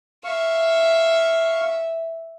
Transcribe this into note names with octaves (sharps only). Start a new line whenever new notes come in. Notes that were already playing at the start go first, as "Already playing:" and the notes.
E5 F5 C#6